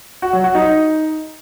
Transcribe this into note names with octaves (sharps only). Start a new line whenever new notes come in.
F#4
F#3
F#4
D#4